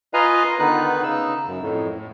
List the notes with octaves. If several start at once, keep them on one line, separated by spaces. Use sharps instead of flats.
F4 B4 D#5 F5 G#5 A#5
D3 D#3 B3 D#4 B4 F#6
C#3 D#4 E6
F#2
F2 A2
A2